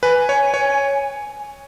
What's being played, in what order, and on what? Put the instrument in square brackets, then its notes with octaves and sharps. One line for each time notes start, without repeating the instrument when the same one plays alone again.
[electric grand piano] B4 [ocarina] G#5
[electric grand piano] C#5
C#5